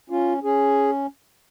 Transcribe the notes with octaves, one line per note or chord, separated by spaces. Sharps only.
C#4 F4
C#4 G#4